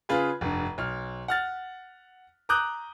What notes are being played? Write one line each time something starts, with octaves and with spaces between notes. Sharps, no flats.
C#3 F4 G#4 B4 B5
F1 G2
B1 F6
F#5 F6 A6
A#5 D6 D#6 F#6 G6